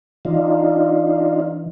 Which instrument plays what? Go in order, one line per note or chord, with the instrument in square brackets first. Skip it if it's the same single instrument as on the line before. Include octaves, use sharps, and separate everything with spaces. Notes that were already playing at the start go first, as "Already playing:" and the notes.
[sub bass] E3 [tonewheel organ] D4 D#4 F4